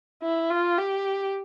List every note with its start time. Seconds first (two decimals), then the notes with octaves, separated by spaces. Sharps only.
0.23 E4
0.50 F4
0.78 G4